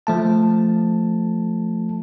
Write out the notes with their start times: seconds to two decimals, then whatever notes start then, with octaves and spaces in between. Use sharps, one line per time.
0.07 F3 A3 A5